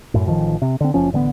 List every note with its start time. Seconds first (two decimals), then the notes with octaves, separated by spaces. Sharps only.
0.14 F#2 A2
0.28 A1 D#3 F3
0.62 C3
0.81 D3 C4
0.94 F#1 F3 C#4
1.13 A1 D3 G#3 B3